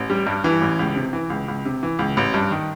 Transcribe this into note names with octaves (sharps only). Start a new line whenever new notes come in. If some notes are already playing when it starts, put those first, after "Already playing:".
Already playing: A1
G3
G2
E3
A1
C#2
C3
E3
C#2
C#2
C3
E3
C#2
A1
G2
D#3